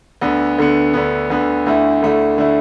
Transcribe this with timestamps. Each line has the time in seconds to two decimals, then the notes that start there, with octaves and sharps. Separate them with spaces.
0.21 D2 D3 B3
0.58 D2 D3 B3
0.94 D2 D3 B3
1.30 D2 D3 B3
1.66 D2 D3 A3 E4
2.02 D2 D3 A3 E4
2.38 D3 A3 E4